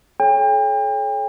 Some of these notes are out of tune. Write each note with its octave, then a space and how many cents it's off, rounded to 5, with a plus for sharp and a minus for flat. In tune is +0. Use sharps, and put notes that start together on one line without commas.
A4 -45 C#5 +0 G5 +40